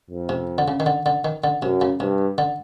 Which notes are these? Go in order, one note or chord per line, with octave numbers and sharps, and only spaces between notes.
F2
C3
D3
C#3
D#3
D3
D3
D#3
D3
F#2 C3
C#3
G2 C3
D3